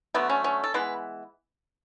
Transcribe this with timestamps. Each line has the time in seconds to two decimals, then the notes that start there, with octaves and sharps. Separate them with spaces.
0.14 D3 F#3 A3 B3
0.30 C#4
0.44 C#4
0.64 A4
0.74 E3 G#3 B3 B4